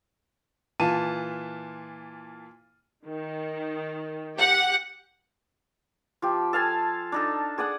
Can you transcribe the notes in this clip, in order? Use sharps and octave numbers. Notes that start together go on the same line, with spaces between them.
A#2 E3 F4 A5 D#7
D#3
G4 F#5
F3 G4
A4 F5 G#5 A5
D4 D#4 A4
G#4 D5 F#5 D#6